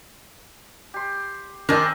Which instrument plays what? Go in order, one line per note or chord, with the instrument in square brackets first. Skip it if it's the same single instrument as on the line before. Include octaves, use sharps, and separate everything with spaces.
[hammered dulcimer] G4 C6
[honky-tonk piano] D#3 D4 A#6 [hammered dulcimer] C4 D#5 G#5 [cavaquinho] A#4 D5